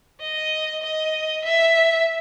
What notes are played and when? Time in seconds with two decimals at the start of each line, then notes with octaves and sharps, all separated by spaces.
0.21 D#5
0.83 D#5
1.45 E5